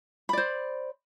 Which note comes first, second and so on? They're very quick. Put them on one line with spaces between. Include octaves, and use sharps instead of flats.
B5 D5 C5